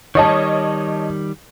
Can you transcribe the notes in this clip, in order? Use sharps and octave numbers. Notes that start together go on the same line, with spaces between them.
D#3 G3 C#5 D#5 A5